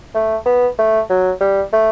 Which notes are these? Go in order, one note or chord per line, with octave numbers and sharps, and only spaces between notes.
A3
B3
A3
F#3
G3
A3